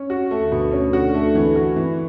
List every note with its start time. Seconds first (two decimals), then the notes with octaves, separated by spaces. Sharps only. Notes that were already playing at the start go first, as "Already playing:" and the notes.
Already playing: C#4
0.10 F#4
0.31 A3
0.41 D2 D3
0.52 B2
0.72 C#4
0.93 F#4
1.14 A3
1.35 E3
1.56 F#4
1.76 E3